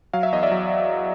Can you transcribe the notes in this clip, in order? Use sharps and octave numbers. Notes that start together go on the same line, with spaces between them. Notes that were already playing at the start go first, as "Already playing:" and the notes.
F#3 F5
E5
E2 D#5
D5 E5
F#3